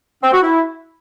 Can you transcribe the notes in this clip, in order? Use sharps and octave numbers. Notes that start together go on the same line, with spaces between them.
C4
F#4
E4